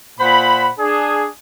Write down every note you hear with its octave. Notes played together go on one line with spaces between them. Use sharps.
A#2 C5 F#5 B5
D4 G#4